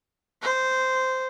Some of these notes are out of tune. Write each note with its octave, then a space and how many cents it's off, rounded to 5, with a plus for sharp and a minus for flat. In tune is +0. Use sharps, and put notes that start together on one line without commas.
C5 -10